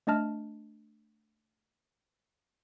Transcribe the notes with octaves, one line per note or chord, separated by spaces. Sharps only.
A3 D4 D#5 A5 F6